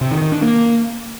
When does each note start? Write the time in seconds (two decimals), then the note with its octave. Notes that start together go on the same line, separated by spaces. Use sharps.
0.01 C3
0.11 D#3
0.22 D#3
0.32 D4
0.42 A#3